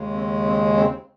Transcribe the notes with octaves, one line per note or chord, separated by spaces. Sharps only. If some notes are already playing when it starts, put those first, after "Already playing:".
Already playing: D#2 C#3 G#3
C4
C4
C4